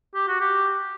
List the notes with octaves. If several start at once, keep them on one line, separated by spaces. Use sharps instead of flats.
G4
F#4
G4